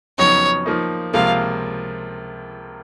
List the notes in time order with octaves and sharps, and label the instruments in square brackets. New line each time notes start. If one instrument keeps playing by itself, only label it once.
[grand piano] F2 C#3 F#3 B3 D#4 [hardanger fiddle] C#5
[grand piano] F3 A#3 D#4
[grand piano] C#2 C3 F3 A#3 [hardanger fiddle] F5